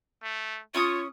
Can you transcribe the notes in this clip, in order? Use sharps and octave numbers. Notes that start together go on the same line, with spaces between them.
A3
C#4 F4 C#5 C#6 D#6